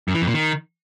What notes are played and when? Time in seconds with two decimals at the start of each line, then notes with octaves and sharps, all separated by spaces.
0.08 F#2
0.14 E3
0.21 F2
0.28 A#2
0.34 D#3